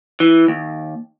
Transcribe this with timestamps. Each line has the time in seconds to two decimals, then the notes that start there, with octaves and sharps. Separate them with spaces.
0.20 E3
0.48 D#2